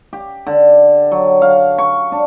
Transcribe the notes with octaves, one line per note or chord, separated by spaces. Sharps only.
G4
D3
F#3
F5
C#6
D4